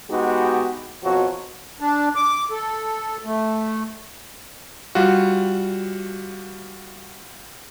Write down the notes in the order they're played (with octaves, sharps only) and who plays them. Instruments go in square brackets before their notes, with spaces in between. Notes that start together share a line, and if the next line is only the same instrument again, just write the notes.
[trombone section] G#3 B3 D#4 F#4 G4
F2 B2 F3 F#3
[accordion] D4
D6
A4
A3
[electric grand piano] G3 F4 F#4